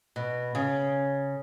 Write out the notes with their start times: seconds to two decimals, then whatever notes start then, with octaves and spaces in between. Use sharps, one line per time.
0.16 B2
0.55 C#3